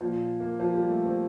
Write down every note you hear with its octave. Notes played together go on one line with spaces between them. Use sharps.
A#2 F3
A#3
F3
G3
A3
C4